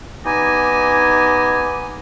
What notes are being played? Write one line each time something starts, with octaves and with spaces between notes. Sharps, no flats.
B3 D#4 G4 D5 D#5 G#5